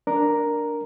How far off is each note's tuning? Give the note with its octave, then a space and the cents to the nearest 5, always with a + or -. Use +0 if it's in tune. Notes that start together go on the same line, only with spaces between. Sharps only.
D4 +0 A#4 +0 A#5 +0